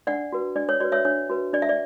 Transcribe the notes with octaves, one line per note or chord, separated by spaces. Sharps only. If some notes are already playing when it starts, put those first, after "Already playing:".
D4 D5 F#5
F#4 B4
D4 D5
C#5
F#4 B4 D5
C#5 E5
D4 C#5
F#4 B4
D4 D5
E5
D5